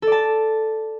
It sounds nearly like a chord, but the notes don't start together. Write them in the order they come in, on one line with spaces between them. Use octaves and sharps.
A4 D5 A5